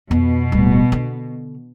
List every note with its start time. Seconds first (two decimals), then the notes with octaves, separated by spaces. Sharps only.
0.11 F2 B2
0.52 D1 G3
0.92 D3